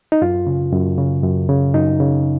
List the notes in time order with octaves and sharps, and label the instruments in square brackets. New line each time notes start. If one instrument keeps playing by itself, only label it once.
[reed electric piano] D#4
F#2 F4
C#3
F#2
C#3
F#2
C#3
F#2 D#4
C#3